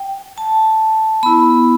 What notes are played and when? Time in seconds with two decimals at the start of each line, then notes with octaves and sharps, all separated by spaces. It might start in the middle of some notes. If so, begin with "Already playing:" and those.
Already playing: G5
0.38 A5
1.23 B3 E4 B5